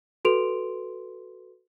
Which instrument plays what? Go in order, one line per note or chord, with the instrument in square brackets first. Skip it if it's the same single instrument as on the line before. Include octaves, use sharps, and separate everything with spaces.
[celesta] F#4 A4 B4 C6 D7 F7